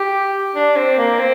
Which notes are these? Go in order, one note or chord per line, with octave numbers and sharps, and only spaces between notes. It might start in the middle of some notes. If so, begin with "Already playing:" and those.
Already playing: G4
D4
C4
A#3
C4